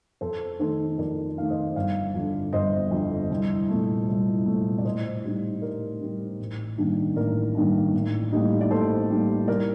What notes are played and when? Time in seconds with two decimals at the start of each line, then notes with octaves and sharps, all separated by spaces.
0.21 F2 A4 C5
0.59 D#3 A3 D#4 A4 C5
0.98 F2 A#4 D5
1.38 D#3 A3 D#4 F5
1.50 C5 D#5
1.76 G1 D5 F5
2.14 F2 D3
2.53 G1 C5 D#5
2.91 F2 D3
3.30 C2
3.68 A#2 A3
4.08 C2
4.46 A#2 A3
4.78 D5
4.85 A2 C5 D#5
5.24 G3 C4 D#4
5.62 A2 A#4 D5
6.01 G3 C4 D#4
6.39 A1
6.78 G2 D#3 A#3 D4
7.16 A1 A#4 D5
7.55 G2 D#3 A#3 D4
7.94 A1
8.32 A2 G3 A#3 D#4
8.61 D5
8.71 A1 A4 C5
9.10 A2 G3 A#3 D#4
9.48 C2 A#4 D5